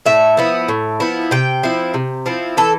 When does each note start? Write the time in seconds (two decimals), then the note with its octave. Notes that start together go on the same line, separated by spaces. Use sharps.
0.06 A2 E5
0.37 F3 B3 E4
0.69 A2
1.00 F3 B3 E4
1.31 C3 G5
1.63 F3 C4 E4
1.94 C3
2.26 F3 C4 E4
2.57 E3 A4